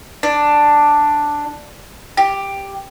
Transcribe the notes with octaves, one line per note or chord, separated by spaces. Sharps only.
D4
G4